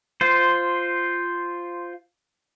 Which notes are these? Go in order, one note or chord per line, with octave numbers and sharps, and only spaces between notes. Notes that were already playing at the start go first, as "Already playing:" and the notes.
F4 C5